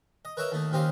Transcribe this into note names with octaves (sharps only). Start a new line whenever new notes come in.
D#5
A#4 B4 C#5 D#5 E5 A#5
D#2 A3 D#4
D#2 C#3 C4 G4 D#5 F5